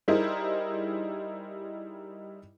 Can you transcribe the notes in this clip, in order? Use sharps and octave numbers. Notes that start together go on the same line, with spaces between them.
G3 D#4 E4 G#4 A#4 C5